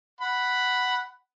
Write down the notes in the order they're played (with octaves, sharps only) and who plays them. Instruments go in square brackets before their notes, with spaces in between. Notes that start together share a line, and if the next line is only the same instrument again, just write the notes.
[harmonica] F#5 B5